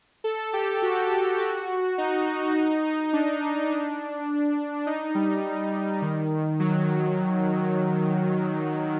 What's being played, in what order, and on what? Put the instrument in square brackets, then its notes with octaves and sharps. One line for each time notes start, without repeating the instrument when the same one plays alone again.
[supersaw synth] A4
G4
F#4
F#4
D#4
D4
D4
D#4
G3
D#3
F#3